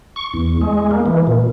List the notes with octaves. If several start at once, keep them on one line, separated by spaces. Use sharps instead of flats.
C#6
E2
G#3
A#3
E3
A#2